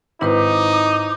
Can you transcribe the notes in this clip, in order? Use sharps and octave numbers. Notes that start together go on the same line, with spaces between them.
G#1 D#4 E4 B4 C5 D6